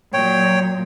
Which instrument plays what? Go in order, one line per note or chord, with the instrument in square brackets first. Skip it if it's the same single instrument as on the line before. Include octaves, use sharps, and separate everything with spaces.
[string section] A#2 F#3 [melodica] C#5 G5